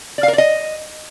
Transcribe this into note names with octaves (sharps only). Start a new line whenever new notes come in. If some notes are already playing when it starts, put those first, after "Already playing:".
D5
F5
A#4
D5
D#5